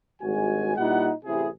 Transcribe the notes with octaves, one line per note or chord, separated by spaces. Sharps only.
G#1 G2 G#3 F#4 G#5
A#2 G3 D#4 E4 F#5
A1 C3 E4 G#4